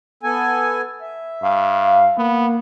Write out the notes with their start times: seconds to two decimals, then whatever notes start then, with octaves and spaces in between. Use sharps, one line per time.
0.23 B3 A4 G#5
1.01 E5
1.43 G2 F5
2.18 A#3 B3